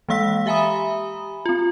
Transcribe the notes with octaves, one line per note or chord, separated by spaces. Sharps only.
E3 G#3 A#3 F5 E6 B6
G4 E5 G#5 A#5 B5 D#6
C4 F4